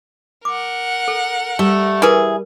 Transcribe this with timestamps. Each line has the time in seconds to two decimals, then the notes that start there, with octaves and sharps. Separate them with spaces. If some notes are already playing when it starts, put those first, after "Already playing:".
0.45 A#4 F#5 D6
1.08 A4
1.59 G3 A3
2.02 E3 G#4 A#4 B4